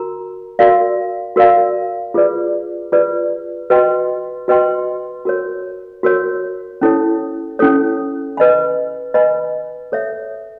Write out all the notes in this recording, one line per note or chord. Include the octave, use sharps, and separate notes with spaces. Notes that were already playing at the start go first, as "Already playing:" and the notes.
Already playing: F#4 A#4 A#5
F#4 A#4 D5 F5
F#4 A#4 D5 F5
F4 G#4 B4 D5
F4 G#4 B4 D5
F#4 B4 D#5 G5 C6
F#4 B4 D#5 G5 C6
F#4 A#4 C#5
F#4 A#4 C#5
C#4 E4 A4 C#5
C#4 E4 A4 C#5
B4 D#5 G#5 B5
B4 D#5 G#5 B5
A4 C#5 E5